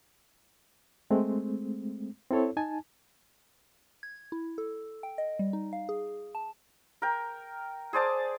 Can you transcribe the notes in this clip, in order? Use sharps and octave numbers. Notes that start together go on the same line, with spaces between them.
G#3 A3 C4
C4 E4 A4 C#5
D#4 G#5 A5
G#6
E4
A4
G5
D#5
G3
D#4
F5
G#4
A5
A#4 G5
G#4 C5 D5 A5